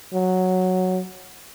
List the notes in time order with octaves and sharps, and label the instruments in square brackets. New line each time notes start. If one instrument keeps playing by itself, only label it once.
[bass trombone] F#3